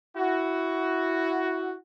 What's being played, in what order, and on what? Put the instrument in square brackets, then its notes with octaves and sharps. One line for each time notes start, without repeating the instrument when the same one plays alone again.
[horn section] E4 F#4